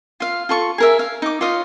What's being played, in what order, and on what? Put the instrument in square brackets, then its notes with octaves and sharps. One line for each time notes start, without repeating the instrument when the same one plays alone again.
[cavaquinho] F4 F5
F4 A4 C#6
G#4 A#4 E5
F5
D#4 D6
F4 C#5 D#5 F5